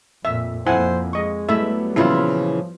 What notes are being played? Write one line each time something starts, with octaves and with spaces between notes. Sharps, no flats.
F2 A#2 E5
F2 A#3 E4 C5 F#5 G#5
G#3 D#5 C#6
F#3 G3 A3 B3 E4 E5
A#2 C#3 E3 F3 E4 F4